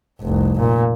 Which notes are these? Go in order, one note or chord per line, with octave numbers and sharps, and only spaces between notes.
F1 C2
A#2